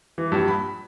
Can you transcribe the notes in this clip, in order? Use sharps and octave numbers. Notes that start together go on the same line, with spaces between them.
E3
A#1 G2
B5